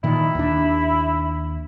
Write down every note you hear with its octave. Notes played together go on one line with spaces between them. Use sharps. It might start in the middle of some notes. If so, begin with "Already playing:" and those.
A#2 D#3 E4
D#2 D4